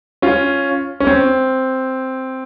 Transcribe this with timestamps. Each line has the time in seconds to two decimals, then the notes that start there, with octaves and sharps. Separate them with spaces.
0.22 C#4 F4
1.00 C#4
1.07 C4